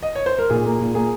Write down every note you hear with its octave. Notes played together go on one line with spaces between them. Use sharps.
D#5
C#5
C5
A#4
A#2 G#4
A#3
A#2
A#3 G#4